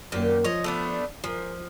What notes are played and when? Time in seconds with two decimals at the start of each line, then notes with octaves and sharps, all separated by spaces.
0.12 F#2 A#2 D#3 A#3 G4
0.44 F3 C#5 D#5
0.64 A3 B3 D4
1.24 F3 G#4 A#4